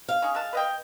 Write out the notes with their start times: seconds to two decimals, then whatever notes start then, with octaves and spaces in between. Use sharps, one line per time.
0.08 F5
0.22 C#4 D#4 G#4
0.35 G#3 A5
0.53 B4 D#5 G5